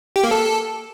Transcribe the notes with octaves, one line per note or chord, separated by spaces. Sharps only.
G4
A#3
A4